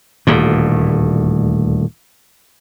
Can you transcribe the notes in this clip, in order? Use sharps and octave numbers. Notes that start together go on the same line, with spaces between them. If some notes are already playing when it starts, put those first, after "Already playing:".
D#1 D2 A2